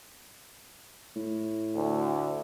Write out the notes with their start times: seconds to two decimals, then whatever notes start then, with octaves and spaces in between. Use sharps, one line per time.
1.16 A2
1.75 D2